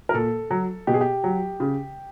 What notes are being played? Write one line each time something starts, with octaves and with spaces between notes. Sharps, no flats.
A#4
A#2 A4
F#3
B2 G4
G#4
G4
F#3
C#3